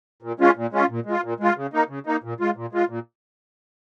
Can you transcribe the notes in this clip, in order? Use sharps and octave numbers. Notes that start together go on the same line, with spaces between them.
A#2
G#3 C#4 F4
A#2
G#3 C#4 F4
A#2
G#3
F4
A#2
G#3 F4
C#3
A#3 D#4
C#3
A#3 D#4
A#2
G#3 F4
A#2
G#3 F4
A#2